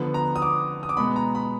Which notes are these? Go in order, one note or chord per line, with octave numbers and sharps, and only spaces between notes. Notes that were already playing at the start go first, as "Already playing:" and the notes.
Already playing: D3 F3 B3 B4
A#5
D#6
D6
D#6
D6
B2 G#3 B3 B5
A#5
B5